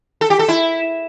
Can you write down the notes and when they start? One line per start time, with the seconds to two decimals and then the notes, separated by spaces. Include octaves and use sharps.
0.21 A4
0.30 G4
0.39 A4
0.48 E4